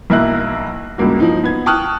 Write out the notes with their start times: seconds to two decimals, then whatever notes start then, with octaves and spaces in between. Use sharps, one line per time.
0.10 B1 A#3 E4 F#6
0.98 C#2 G2 A#3 F#4
1.20 F3 D#4
1.44 B3 G#6
1.66 G5 A5 C#6 D#6 F6 F#6